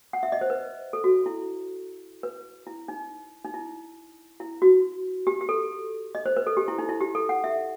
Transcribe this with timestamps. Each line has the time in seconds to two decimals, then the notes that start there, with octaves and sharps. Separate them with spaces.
0.13 F#5
0.23 E5
0.32 D#5
0.41 C5
0.50 B4
0.93 A4
1.04 F#4
1.26 E4
2.23 B4
2.67 E4
2.88 D#4
3.45 D#4
3.54 E4
4.40 E4
4.62 F#4
5.27 G4
5.41 G4
5.49 A4
6.15 D#5
6.26 C5
6.37 B4
6.47 A4
6.57 G4
6.68 E4
6.78 D#4
6.89 E4
7.00 G4
7.15 A4
7.29 F#5
7.44 E5